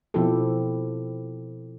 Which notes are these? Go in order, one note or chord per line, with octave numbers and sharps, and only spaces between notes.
B2 F3 C4 E4 G4 A4